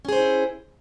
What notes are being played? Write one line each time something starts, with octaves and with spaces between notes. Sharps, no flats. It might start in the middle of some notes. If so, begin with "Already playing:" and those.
C#4 E4 G#4 C5